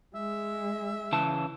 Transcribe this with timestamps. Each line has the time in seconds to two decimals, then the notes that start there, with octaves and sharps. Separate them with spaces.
0.15 G#3 E5
1.12 C#3 E3 A5